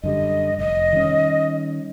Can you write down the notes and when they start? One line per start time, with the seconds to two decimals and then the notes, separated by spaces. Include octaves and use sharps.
0.03 F#2 D3 G3 D#5
0.59 F1 D#5
0.93 D#3 G3 C#4